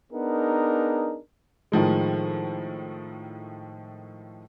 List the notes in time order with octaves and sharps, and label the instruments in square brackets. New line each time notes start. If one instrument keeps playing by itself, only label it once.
[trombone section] B3 D4 D#4 G#4 A#4
[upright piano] A2 D#3 F3 G#3